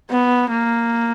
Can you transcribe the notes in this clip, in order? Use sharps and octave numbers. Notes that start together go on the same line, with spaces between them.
B3
A#3